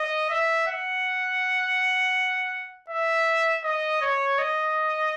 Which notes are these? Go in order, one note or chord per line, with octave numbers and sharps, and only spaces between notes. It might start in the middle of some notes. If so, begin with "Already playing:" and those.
Already playing: D#5
E5
F#5
E5
D#5
C#5
D#5